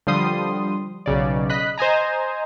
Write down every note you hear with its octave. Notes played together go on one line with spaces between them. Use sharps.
D3 F3 G3 C6 D#6
B1 C#3 D5
D#5 B5 F#6 B6
C5 D#5 G#5 A#5